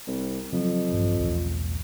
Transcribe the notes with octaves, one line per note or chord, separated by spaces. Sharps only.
C2
F2 C#3 F3 F#3
A#1 G2 E3
B1 E2 A2